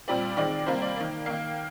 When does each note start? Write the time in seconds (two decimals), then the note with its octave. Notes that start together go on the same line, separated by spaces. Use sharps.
0.08 A#2 G3 C4 D5
0.37 D#3 G#3 C4 D5
0.66 C3 G3 A#3 C5
0.82 D5
0.97 D#3 A#3
1.26 D#3 A#3 F5